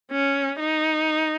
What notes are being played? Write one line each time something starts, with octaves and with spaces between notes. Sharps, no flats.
C#4
D#4